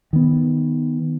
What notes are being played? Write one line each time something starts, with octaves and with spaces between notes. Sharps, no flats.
D#3 B3